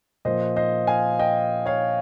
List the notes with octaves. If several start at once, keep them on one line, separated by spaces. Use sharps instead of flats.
A#2 F3 C5 D#5
C5 D#5
F5 G#5
D#5 G5
C#5 F5